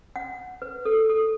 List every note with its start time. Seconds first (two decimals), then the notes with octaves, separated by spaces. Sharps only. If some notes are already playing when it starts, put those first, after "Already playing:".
0.16 F#5
0.62 B4
0.85 A4
1.10 A4